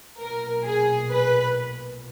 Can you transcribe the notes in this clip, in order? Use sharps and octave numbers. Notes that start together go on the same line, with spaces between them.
B1 A#2 A#4
G#4
B4